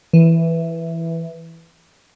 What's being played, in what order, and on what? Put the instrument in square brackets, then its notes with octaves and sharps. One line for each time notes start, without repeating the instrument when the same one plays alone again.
[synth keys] E3